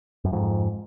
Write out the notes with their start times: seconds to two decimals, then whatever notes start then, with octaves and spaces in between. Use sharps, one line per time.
0.25 F#2
0.32 F2 G#2